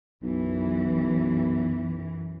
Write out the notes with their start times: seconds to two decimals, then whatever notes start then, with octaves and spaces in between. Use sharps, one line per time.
0.23 B1 F#2 E3